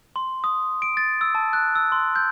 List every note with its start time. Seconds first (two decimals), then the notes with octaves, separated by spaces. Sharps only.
0.16 C6
0.44 D#6
0.82 D7
0.97 A6
1.21 E6
1.35 A5
1.53 F#6
1.75 E6
1.92 C6
2.16 G6